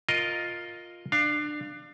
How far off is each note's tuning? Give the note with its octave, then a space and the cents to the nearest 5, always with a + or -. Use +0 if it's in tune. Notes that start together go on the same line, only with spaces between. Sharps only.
F4 +5 A#4 +0 D#5 +0
D4 +25 F5 -5